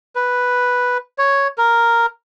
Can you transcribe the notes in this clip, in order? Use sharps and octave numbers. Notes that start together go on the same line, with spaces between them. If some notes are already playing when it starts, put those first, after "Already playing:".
B4
C#5
A#4